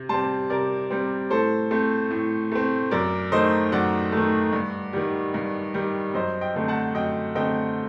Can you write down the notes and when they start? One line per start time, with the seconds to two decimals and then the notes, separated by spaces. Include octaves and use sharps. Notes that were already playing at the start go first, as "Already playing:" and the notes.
Already playing: C3
0.09 G3 C4 A5 C6
0.50 C3 A#4 D5
0.90 G3 C4
1.30 A2 A4 C5
1.71 A3 C4
2.11 A2
2.52 A3 C4
2.91 F#2 A#4 D5
3.32 D#3 A3 C5 D#5
3.72 F#2 D5 F#5
4.12 D#3 A3
4.53 G2
4.93 D#3 G3
5.34 G2
5.74 D#3 G3
6.14 F#2 C5 D#5
6.41 D#5 G5
6.55 D3 A3 C4
6.68 F#5 A5
6.95 F#2 D#5 G5
7.35 D3 A3 C4 D#5 G5